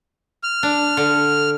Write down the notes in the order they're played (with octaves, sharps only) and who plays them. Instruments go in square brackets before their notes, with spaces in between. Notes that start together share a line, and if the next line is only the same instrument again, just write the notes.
[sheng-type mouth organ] F6
[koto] D4
D3